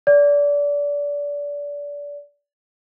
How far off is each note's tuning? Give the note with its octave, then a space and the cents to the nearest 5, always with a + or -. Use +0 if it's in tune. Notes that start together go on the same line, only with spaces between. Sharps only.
D5 -25